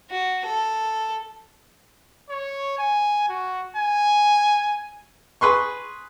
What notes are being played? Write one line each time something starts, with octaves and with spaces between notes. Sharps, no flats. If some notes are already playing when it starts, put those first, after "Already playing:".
F#4
A4
C#5
G#5
F#4
G#5
G#4 B4 C6 C#6